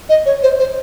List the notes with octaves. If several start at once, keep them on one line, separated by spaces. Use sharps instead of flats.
D#5
C#5
C5
C5